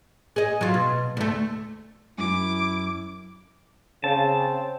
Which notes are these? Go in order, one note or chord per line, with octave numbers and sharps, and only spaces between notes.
G#4 D#5
F#3 F4
B2
D2 A3
F#2 E4 D6
C#3 C4 A5